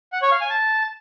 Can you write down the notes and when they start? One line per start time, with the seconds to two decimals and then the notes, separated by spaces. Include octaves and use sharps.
0.12 F#5
0.22 C#5
0.31 F5
0.41 G#5
0.50 A5